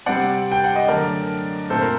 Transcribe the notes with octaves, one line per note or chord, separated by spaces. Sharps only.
C3 G3 C4 D5 F#5
G5
F#5
D#5
F#2 D3 A3 A#4 D5
A#2 A3 C4 A4 C5
A#4